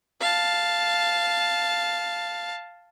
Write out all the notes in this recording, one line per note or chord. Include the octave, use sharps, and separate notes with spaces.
F5 A5